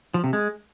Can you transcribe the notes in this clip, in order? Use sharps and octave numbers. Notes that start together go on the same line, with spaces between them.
F3
C3
G#3